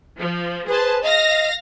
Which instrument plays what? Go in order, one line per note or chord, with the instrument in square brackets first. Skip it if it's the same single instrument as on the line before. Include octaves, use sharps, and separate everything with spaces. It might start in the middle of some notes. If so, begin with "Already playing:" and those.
[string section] F3
[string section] G#4 C5 A5 [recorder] B4
[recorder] D#5 [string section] F5 A#6